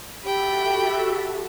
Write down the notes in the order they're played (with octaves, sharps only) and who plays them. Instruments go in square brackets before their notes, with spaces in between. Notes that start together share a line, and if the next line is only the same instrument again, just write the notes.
[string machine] F#4 A4 E5 [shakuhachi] G4 [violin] G5 B5